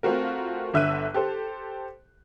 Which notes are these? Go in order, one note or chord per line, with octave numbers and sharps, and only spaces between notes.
A3 C4 F4 F#4 A#4
G1 D3 E5 E6 F#6 D#7
G4 A4 C5